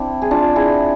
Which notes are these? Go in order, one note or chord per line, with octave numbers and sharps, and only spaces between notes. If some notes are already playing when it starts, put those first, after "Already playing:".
Already playing: C4 D4 E4
G#4
D4 F4
E4 G#4